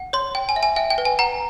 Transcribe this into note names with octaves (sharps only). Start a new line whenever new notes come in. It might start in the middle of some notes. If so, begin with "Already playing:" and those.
Already playing: F#5
C#5 C6
G5
G#5
E5
G#5
E5 G5
G5
B4
G#5
F#5 A#5